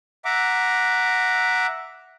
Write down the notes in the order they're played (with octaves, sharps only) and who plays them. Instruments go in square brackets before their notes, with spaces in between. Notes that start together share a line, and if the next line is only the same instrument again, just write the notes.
[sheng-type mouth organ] E5 F#5 A#5 D6